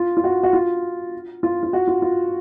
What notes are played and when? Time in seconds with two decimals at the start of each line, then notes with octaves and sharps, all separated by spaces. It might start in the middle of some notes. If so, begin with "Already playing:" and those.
Already playing: F4
0.17 F4
0.24 F#4
0.43 F#4
0.53 F4
1.43 F4
1.63 F4
1.73 F#4
1.88 F4
2.02 F4